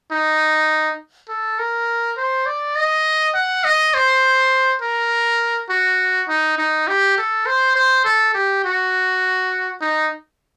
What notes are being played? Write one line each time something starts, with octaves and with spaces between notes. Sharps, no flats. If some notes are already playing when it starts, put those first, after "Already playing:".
D#4
A4
A#4
C5
D5
D#5
F#5
D#5
C5
A#4
F#4
D#4
D#4
G4
A4
C5
C5
A4
G4
F#4
D#4